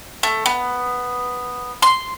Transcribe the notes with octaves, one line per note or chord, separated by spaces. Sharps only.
A3
B3
C6